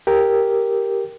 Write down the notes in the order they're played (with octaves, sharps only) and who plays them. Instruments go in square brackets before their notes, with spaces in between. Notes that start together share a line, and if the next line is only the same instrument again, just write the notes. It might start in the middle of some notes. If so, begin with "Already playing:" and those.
[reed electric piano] G4 A#4